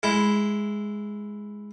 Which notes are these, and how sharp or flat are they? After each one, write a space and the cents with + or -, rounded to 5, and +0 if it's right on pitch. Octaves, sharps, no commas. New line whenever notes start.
G#3 +0 E4 +0